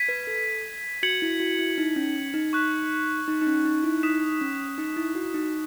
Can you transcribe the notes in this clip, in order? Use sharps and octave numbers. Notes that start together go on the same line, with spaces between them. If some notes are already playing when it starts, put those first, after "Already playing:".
Already playing: G#6 B6 D#7
B4
A4
F#4 G#6 C#7 F#7
E4
F#4
E4
D#4
C#4
D#4
C#6 F#6 B6 E7
D#4
D#4
C#4
D#4
E4
D#4 D#6 F#6 B6 E7
C#4
D#4
E4
F#4
D#4